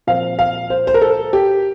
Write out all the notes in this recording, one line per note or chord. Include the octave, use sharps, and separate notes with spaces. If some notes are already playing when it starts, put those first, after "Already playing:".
A#2 F3 C4 F5
F5
C5
C5
A#4
A4
G4